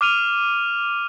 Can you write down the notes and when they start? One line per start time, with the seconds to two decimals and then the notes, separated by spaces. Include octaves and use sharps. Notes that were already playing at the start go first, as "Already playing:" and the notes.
0.01 D6 F6 D#7 F7